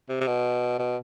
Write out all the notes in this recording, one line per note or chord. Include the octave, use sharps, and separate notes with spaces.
C3
C3
B2
B2